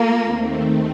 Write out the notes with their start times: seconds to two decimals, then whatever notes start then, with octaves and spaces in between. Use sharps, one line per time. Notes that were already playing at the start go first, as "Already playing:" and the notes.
Already playing: A#3 F4 A4
0.24 D#2 D#3 A3 C4